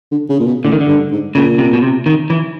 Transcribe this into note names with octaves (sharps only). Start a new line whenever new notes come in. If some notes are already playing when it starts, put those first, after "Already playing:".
D3
C#3
A#2
B2
A2 D3
D#3
D3
G2
G#2
A#2 C#3
C3
B2
C3
D#3
E3